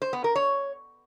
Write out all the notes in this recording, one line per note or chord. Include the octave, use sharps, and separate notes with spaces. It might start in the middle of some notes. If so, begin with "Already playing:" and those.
C5
B3
A#4
C#5